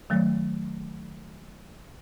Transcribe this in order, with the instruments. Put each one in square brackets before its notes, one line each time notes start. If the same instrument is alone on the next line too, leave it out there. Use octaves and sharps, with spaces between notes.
[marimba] D#3 F#3 A3